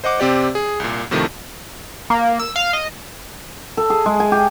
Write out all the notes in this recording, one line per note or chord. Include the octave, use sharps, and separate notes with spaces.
C5 D#5 F#5 D6
C3 C4 G4 D5
G#4
C2 A#2
A2 C3 D#3 F3 A3
A#3
E6
F5
D#5
A4
G#4
G#3
G#5
G4